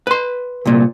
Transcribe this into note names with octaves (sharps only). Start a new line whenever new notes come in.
B4 C6
C2 A#2